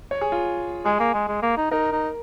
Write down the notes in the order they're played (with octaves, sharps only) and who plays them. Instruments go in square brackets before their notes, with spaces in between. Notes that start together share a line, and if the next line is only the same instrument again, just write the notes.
[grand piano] C#5
G#4
F4
[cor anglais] G#3 [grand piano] G#4
[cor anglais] A#3
G#3
G#3
A#3
D#4
[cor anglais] D#4 [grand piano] A#4
[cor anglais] D#4